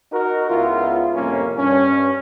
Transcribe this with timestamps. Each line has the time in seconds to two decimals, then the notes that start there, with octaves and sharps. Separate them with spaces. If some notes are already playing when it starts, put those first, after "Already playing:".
0.12 D#4 F#4 A#4
0.49 C#2 B3 E4 F4
1.14 F2 A2 C3 G3 A#3 C#4
1.58 G2 C#4